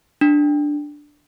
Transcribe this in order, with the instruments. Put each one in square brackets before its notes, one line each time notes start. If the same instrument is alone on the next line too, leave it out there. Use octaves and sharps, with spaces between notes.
[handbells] D4